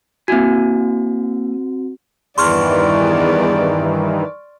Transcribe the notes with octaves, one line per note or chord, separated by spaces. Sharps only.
A#3 C4 E4 F#4 G#5
E2 G2 D#3 E3 D5 C6 C#6 F6